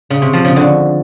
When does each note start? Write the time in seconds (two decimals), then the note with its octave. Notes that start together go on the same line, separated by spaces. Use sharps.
0.10 C#3
0.22 C3
0.33 F3
0.45 C#3
0.56 D3